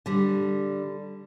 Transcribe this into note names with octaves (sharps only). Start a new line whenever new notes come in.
D3 G3